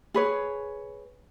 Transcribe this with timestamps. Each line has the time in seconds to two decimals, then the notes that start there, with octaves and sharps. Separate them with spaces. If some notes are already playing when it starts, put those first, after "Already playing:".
0.14 G#4 B4 C#5